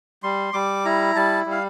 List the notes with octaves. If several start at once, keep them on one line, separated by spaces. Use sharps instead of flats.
G3 C6
G3 D6
E4 A#5
G3 A5
G3
F5